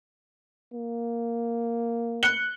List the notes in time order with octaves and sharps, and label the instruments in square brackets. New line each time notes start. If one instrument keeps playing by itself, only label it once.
[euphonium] A#3
[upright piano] F#6 C#7 G7